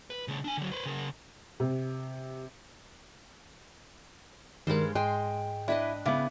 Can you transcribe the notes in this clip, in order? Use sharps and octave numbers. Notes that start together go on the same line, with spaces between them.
B4
C#3 A3
D4 G#5
D3 F#3
B4 C5
C#3 A#4
C3
G2 D#3 G3 G#3 A#4 C5
G#2 G#3 G5 C6
D4 E4 B4 D#5
C#3 B3 E4 F5 D6